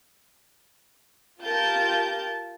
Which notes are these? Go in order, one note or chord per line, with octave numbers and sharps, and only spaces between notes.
F4 G4 A#4 A5 G6